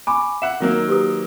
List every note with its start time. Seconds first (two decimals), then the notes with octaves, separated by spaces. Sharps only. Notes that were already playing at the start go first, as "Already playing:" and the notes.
0.07 G#5 B5 C#6 D6
0.42 E5 F#5 E7
0.60 D#3 F#3 A#3
0.88 G4 B4 D#6